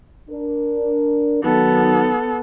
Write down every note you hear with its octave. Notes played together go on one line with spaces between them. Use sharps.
D4 A#4
D#3 F#3 B3 D#4 A4